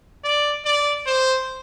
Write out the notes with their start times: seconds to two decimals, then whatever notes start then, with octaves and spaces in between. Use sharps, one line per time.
0.24 D5
0.65 D5
1.06 C5